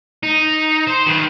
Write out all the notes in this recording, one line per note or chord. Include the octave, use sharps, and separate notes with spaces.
D#4
C5
D#3 B4